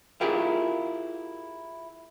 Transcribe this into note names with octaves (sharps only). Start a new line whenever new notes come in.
E4 F4 G4 G#4 A#4